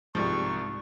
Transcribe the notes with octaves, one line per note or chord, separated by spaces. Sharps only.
C2 G#2 F3 G3 C#6